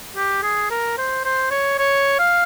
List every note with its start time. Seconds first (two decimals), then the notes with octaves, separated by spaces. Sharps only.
0.16 G4
0.43 G#4
0.70 A#4
0.98 C5
1.25 C5
1.51 C#5
1.79 C#5
2.19 F5